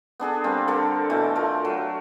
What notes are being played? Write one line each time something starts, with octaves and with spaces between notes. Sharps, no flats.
B3 D4 G#4 A4
G3 A#3 C4
D3 A4 A#4
B2 E3 A3
A3 F4 A#4
F#3